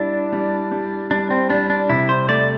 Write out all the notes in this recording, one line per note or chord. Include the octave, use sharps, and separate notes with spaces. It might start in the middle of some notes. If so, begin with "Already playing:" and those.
Already playing: G3 D4 E4
G3
G3
G3 D4
C4
G3 D4
D4
C3 E4
C5
A3 D5